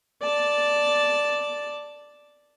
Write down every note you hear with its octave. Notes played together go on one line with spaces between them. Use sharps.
D5 A5